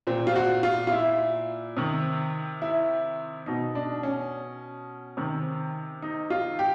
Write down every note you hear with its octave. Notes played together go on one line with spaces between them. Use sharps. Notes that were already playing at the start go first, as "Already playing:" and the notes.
A#2 C4
F4
F#4
F4
F4
E4
C3 D#3
E4
B2 D#4
D4
C#4
C3 D#3
D#4
F4
G4